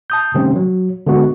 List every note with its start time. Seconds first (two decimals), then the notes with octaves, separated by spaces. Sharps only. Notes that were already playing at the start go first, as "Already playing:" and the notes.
0.10 A5 D#6 G6
0.35 C3 D#3 G3 A3 C4 C#4
0.56 F#3
1.07 D3 G#3 B3 F#4